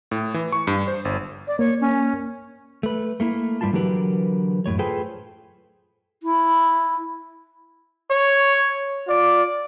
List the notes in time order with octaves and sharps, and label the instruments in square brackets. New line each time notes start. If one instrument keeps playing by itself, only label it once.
[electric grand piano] A2
E3
C#6
G2
C5
G1
[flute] D5
[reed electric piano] A#3 [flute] C#5
[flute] C#4
[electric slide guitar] A3 B4
A3 A#3 E4
G#2 G3 E4 F4 A5
D3 E3 F#3 G4 A#4 B4
F#2 A2 C#5
F4 G#4 A4 B4 C5 G5
[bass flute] E4
[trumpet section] C#5
F4 D5